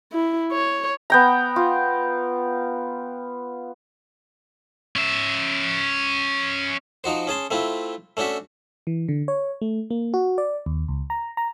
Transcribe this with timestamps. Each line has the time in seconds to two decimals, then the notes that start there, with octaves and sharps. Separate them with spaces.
0.13 E4
0.52 C#5
1.10 B3 G5 A#5
1.56 F4
4.96 C#4 E5
7.04 F3 D#4 F#4 C5
7.27 C#4 G#4 A5 C6
7.51 A3 C4 E4 F4
8.17 A3 C#4 D4 F#4 E5
8.87 E3
9.09 D3
9.28 C#5
9.61 A3
9.90 A#3
10.14 F#4
10.38 D5
10.66 D#2
10.88 C#2
11.10 A#5
11.37 A#5